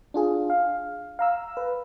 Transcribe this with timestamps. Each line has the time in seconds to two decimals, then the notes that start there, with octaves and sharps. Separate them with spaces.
0.14 D4 F4 G#4
0.50 F5
1.19 F5 A#5 E6
1.57 B4